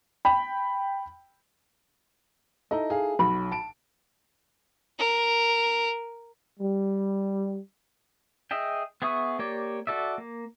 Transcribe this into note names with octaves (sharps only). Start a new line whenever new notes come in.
G5 B5
D#4 E4 A4 D#5
G#4 F5
B1 F#4 B5
A5 D7
A#4
G3
G#4 D#5 E5 G5
B3 G#4 E5 C#6 D#6
A#3 G4 C#5 D5
F#4 A4 D5 E5
A#3